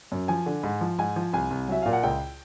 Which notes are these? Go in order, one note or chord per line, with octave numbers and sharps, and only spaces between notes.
F#2
F3 G#5
D3
G#2
F3
G#2 G#5
F3
C2 G#5
C2
F#3 E5
A#2 F5
F#5
C#2 G5